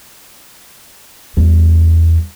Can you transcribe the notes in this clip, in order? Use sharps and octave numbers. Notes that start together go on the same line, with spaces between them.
E2 G3